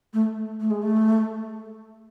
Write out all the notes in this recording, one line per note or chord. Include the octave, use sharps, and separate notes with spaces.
A3
A3
G#3
A3